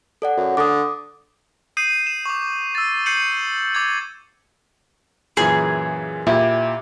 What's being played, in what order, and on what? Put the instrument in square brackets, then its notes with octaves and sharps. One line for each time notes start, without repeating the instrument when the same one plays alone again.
[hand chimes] A4 D5 F#5
[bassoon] F#2
[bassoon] D3 [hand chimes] D6 D#6
[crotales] D#6 G6 C7 D#7
E7
C#6 D6
E6 A6
G6 C7 C#7 D#7 F#7
D6 G#6
[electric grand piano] F#2 A#2 E3 [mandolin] G#4
[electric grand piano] A#2 G4 [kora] E4